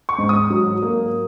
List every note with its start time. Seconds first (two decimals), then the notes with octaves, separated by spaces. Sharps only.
0.09 C#6
0.18 G#2
0.29 D#6
0.50 F#3
0.82 A#3